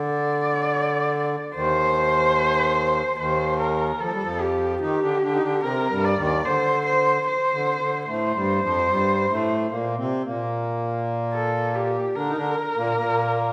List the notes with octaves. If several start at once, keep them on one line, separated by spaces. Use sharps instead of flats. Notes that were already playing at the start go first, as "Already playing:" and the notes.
Already playing: D3 D5
D#2 D#3 C5
D#2 D#3 C5
A#4
F3 A4
G3
F2 F3
G4
D#3 D#4 G4
D3 D4
D3 D4
D#4
D3 D4
C3 C4 A#4
G2 G3
D5
D#2 D#3
D3 C5
C5
C5
D3
D3
A2 A3 C5
G2 G3
F2 F3
G2 G3
A2 A3
A#2 A#3
C3 C4
A#2 A#3
A4
G4
D3 D4 A#4
D#4
D3 D4
A#2 A#3
A#2 A#3